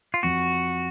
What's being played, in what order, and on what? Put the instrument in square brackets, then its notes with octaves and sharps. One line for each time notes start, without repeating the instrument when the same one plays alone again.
[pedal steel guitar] F4
[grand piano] F2 [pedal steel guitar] F#4